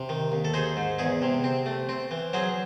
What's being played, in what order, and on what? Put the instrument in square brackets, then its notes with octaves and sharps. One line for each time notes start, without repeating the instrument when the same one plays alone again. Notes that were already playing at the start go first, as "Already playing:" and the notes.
Already playing: [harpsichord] C3
D#3
D#2
A4
D#4 G#4 C5
G#2
E2 E4 G#4
C3
C4
A3
C4
E3
F#3 G#4 C5